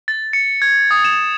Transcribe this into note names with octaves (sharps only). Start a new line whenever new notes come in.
A6
C#7
G#6
D#6
E7